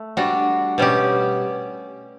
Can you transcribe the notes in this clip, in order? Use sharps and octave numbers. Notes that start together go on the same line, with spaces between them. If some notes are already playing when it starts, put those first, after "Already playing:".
Already playing: A3
G3 D4 F#4
B2 G3 C#4 G4